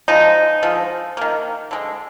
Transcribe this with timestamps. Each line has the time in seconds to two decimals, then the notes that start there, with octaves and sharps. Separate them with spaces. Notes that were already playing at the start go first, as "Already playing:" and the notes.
0.08 D3 F3 G#3 D#4
0.63 D3 F3 G#3
1.17 D#3 A#3
1.71 D3 G#3